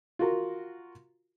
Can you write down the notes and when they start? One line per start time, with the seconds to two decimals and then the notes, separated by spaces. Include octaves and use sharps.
0.19 F4 F#4 A#4